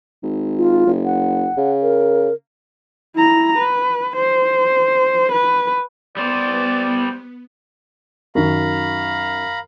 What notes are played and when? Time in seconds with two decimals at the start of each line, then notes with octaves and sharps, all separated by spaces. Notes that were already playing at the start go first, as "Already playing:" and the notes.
0.23 G#1
0.58 F4
0.86 F#1
1.05 F#5
1.57 C#3
1.82 A#4
3.15 E4 A#5
3.57 B4
4.16 C5
5.31 B4
6.17 G3 B3 C5 D5
8.35 F#2 D#3 F5 A#5 B5